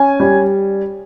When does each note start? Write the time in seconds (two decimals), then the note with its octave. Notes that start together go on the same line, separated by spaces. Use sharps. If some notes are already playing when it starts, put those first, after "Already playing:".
Already playing: C#4 G#5
0.20 G3